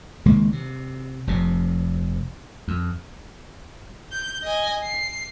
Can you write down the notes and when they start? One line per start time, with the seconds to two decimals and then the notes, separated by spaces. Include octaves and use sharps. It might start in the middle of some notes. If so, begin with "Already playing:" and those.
0.26 C#2 D#3 G#3 A#3
0.52 C3
1.27 F1 F2 C3
2.68 F2
4.12 G6
4.43 D#5 G#5
4.84 C7